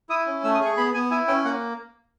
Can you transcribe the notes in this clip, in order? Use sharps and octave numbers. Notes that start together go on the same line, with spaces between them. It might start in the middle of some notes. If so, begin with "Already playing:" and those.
E4 D#6
C#4
A3 E6
D#6
G#4
C#6
B3 B5
B3 G#5
E4 G#5
C#4 G5
A#3 F#5